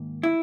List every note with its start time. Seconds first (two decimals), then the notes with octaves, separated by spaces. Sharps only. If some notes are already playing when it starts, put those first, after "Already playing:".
Already playing: G#2 D#3 A#3
0.23 E4